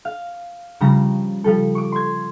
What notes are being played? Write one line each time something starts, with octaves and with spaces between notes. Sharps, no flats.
F5
C#3 F3 G3 A#5 A#6
F3 G3 A4
C#6 D6
C6 G#6